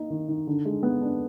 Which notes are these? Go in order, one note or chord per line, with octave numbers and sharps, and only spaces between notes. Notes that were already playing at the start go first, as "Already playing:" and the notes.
Already playing: A#3 D#4
D#3
D#3
D3
G#3
B3
D4